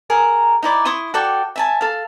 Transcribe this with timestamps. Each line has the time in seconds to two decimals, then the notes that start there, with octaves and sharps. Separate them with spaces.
0.10 G#4 A#4 A#5
0.63 D#4 E4 D5
0.85 E4 C6 C#6 D#6
1.14 F#4 A4 D5 G5
1.56 E5 G#5 A5
1.81 A4 F5